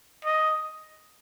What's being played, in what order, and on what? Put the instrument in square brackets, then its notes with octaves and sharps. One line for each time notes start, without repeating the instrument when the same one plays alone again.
[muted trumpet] D#5